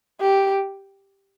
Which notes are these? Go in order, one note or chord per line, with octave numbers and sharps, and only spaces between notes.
G4